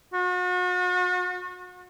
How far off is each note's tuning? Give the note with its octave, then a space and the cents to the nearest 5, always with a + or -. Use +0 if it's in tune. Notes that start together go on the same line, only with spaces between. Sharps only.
F#4 -40